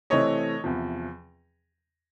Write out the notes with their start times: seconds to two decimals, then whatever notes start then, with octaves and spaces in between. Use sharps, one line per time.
0.10 C3 E3 A3 C4 C#5 D#5
0.64 E2 C3 F3